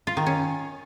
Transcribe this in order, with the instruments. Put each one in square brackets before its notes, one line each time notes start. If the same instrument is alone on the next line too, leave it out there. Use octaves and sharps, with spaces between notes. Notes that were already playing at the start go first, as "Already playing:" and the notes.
[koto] F4
D#3
C#4